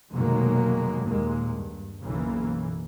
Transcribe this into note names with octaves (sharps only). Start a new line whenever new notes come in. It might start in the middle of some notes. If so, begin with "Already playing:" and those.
F1 B2 D#3 F#3 G#3 A#3
D#2 A#2 G#3 A#3
G2
B1 F#2 C#3 E3 A#3